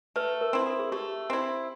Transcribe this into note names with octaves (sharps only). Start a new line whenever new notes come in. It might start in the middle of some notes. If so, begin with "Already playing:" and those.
A3 B4
A#4
C4 E4
A4
G#4
A3 G4
C4 E4